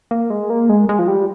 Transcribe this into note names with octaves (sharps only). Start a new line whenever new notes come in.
A#3
G#3
A#3
G#3
G#3
F3
G3